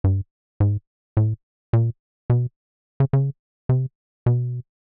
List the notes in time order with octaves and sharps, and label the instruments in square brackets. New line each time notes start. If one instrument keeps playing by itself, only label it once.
[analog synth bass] G2
G#2
A2
A#2
B2
C#3
C#3
C3
B2